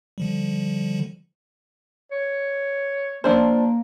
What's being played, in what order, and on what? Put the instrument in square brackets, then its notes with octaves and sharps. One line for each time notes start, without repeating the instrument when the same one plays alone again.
[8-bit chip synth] D3 F3 G3
[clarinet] C#5
[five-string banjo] F3 D4 C5 [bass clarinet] A#3